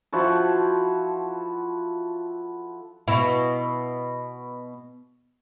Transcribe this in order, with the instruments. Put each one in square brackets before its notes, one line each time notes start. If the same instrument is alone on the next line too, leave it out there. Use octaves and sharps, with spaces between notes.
[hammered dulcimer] F3 E4 F#4 A4
[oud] B2 E4